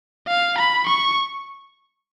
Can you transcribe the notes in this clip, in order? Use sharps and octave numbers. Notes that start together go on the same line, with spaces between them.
F5
B5
C#6